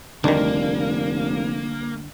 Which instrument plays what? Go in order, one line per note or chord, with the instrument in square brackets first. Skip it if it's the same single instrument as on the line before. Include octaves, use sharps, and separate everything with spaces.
[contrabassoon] F1 [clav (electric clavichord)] D2 D#3 [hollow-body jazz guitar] D3 G3 D4 [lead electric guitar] A#3